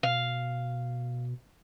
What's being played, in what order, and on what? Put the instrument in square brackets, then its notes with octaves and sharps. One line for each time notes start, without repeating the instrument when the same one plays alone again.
[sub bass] B2 [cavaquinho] F5